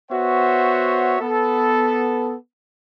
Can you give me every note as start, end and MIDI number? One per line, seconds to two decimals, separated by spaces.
0.11 1.16 59
0.11 1.16 66
0.11 1.16 72
0.11 1.16 73
0.11 1.16 76
0.11 1.16 78
1.21 2.34 59
1.21 2.34 69